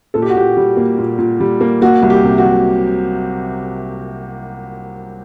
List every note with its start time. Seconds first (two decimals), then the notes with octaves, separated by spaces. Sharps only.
0.14 A#2 A4
0.22 G4
0.30 F#4
0.35 A#2 G4
0.57 G3
0.77 A#3
0.98 A#2
1.19 A#2
1.40 G3
1.61 A#3
1.82 A#3 F#4
2.02 C2
2.10 G4
2.24 C3
2.38 F#4
2.45 F#3